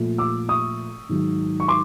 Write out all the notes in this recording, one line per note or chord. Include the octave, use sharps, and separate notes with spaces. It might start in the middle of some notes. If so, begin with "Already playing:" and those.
Already playing: A#2 F3 A3
D6 E6
C#6 D#6
G#2 D#3 F#3
C#6
C6 D6